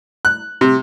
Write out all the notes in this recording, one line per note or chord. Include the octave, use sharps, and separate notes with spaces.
F#6
C3